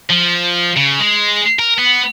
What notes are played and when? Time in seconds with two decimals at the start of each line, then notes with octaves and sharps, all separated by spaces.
0.10 F3
0.77 C#3
1.01 G#3
1.59 A#4
1.78 B3